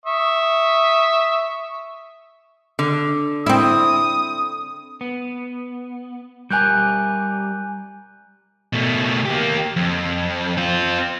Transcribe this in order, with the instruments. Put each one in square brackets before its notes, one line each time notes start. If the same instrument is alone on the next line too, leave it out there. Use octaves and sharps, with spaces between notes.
[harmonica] E5 C#6 D#6
[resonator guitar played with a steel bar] D3
[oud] C4 E4 [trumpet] D#6
[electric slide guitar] B3
[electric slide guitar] G3 G4 A#4 [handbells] G#5 F#6 G6
[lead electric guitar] B2 A3
A#3 G4
F2
C4 F4